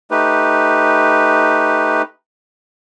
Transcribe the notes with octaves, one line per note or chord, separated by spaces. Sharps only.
A3 D#4 G4 B4